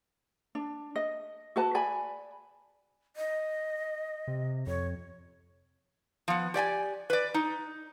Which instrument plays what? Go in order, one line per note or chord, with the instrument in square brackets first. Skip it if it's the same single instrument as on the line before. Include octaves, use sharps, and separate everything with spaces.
[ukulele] D4
D#5
F#4 B4 A5
D5 G#5 B5
[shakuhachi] D#5
[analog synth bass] C3
[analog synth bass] F2 [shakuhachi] C#5
[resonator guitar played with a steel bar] F3 B3
G4 D5 G5 G#5
B4 D5
D#4